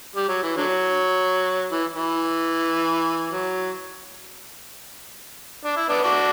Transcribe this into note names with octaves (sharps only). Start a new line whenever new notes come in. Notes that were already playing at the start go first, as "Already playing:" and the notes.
G3
F#3
E3
D3 F#3
E3
E3
F#3
D4
E4
B3 D4
D4 F#4